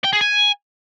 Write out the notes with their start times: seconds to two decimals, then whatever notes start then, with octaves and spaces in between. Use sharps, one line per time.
0.04 G5
0.13 G#4
0.21 G#5